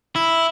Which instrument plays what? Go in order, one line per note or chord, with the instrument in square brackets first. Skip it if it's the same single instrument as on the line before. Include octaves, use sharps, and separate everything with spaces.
[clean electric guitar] E4